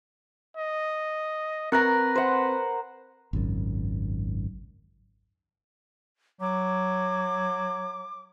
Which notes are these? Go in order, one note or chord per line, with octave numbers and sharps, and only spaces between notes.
D#5
C4 A#4 B4 A#5 F#6 A#6
C5 F#5
G#1 C#2 F#2
F#3 D6